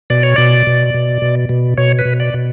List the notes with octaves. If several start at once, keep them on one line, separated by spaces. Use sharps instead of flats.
B2 D5
C#5
B2 D5
B2
B2
B2
B2
B2 C#5
B4
B2
D5
B2